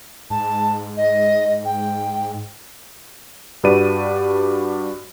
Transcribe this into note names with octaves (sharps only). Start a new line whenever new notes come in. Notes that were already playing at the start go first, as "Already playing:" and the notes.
G#2 A5
D#5
G5
G2 F#4 G4 B4 D5 D#7